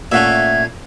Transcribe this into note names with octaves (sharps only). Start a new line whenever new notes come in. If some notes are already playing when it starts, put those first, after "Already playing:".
A#2 A3 C#4 E5 F#5 G#6